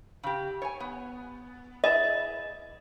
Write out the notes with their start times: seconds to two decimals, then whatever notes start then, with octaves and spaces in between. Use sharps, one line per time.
0.23 C#3 G4
0.62 C#5 G#5
0.80 B3
1.84 E4 G#4 D#5 E5